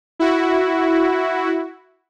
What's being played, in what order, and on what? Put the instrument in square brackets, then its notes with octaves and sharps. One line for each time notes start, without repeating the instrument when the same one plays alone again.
[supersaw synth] E4 F#4